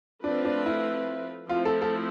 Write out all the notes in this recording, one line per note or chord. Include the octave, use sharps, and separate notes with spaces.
F3 A3 C4 D4 F4 B4
D4
E4
F3 A3 C4 E4 F4
A4
A4